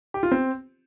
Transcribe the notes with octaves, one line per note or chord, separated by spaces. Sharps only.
G4
F4
C4